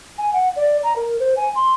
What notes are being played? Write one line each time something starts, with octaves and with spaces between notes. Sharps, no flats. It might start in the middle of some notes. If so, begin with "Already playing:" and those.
G#5
F#5
D5
A#5
A#4
C5
G#5
C6